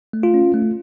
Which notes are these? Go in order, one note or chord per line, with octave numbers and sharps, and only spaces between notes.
A3
F4
C#4
A3